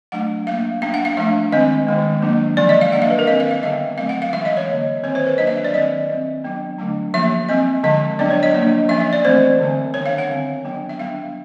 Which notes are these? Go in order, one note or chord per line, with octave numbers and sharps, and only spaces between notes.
F#3 A3 D4 F#5
G3 A#3 D4 F5
G3 B3 D4 F5
F#5
F5
F3 A3 D4 E5
D#3 G#3 C4 D#5
D#3 G#3 B3
F#3 A#3 D4
D3 F3 G#3 C#4 D5
D#5
F5
G3 A#3 D4 F#5
F5
B4
A#4
D#3 G3 C4 D#5
F5
F5
D3 G3 B3 E5
F#3 A3 C4 F5
F#5
F5
E3 G#3 C#4 E5
D#5
C#5
D3 G3 A#3
D#3 G3 C4 C#5
C5
B4
F#3 A#3 D4 D#5
E5
D#5
D5
D#3 G3 C4 D#5
G3 C4
F#3 B3 D4
D3 F#3 A3 D4
F3 A#3 C#4 E5
G3 C4 D#5
D3 F3 G#3 D#5
F#3 B3 D4 D5
C#5
D#5
F3 A#3 D4
F3 A#3 C#4 E5
D#5
D5
E3 A3 C4 C5
D3 G3 C4
D#3 G3 B3 D4 C#5
F5
F#5
D3 G3 C4
F#3 B3 D4
E5
G3 B3 D4 F5